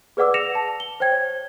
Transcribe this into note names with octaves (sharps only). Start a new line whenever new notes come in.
G#4 B4 D5 F#5 D6 E6
A#6 C#7 E7 F7
A5
G7
C5 C#5 G5 G#6
C#5